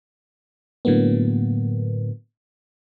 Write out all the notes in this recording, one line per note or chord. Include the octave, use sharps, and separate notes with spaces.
A2 D3 F#3 A#3 B3